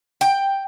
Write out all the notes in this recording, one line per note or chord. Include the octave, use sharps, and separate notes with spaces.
G5